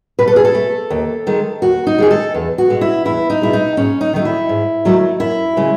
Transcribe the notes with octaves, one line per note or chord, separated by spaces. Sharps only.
B2 B4
A4
G#4
A4
A3
D#2
D#3 G#3
D#2 F#4
D#4
D#3 G#3 G#4
A4
E2
F#4
B2 G#3
E4
E2 E4
D#4
B2 G#3 E4
D#4
G#2 C#4
D#4
D#3 F#3 A3 D#4
E4
G#2
D#3 F#3 A3
F#2 E4
C#3 G#3